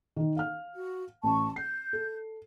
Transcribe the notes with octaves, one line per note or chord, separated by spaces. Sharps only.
D#3 D#4
F5 F6
F#4
A1 A5 C#6
G6 C7
A4